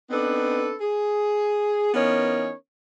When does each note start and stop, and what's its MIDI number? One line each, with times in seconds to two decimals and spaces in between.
0.10 0.73 59
0.10 0.73 60
0.10 0.73 62
0.10 0.73 63
0.10 0.73 69
0.10 0.73 71
0.81 1.90 68
1.94 2.51 52
1.94 2.51 59
1.94 2.51 61
1.94 2.51 63
1.94 2.51 70
1.94 2.51 73